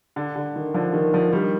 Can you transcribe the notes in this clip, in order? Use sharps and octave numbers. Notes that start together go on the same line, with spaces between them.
D3
D3
D#3
D3 F3
D#3
D3 F3
D#3 G3